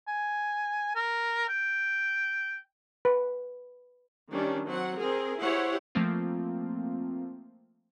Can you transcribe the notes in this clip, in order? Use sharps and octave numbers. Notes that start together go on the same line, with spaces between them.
G#5
A#4
G5
B4
D#3 G3 C#4 D4
F#3 C4 F#5
C4 G#4 A#4
E4 G4 G#4 C5 C#5 F#5
F3 A3 A#3 C4 F4